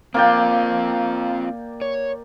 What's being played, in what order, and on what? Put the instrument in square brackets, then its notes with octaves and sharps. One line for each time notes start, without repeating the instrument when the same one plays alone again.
[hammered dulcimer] A#3 D5 G5 [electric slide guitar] C4 F4
[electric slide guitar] C#5